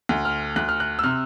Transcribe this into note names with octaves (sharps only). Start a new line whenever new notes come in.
D2
F6
D2 F#6
F6
F#6
E6
C3 F6